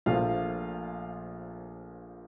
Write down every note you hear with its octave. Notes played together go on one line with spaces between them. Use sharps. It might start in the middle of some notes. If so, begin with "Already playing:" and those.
A#1 A#2 F3 A3 F4 F5